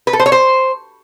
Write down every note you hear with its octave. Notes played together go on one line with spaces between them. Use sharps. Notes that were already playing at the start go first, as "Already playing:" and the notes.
B4
A4
C5
C#5
C5